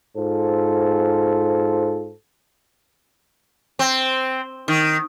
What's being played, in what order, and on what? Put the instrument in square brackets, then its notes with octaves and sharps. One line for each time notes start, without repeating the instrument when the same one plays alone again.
[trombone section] G#2 F4 A4 C5
[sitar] C4
D#3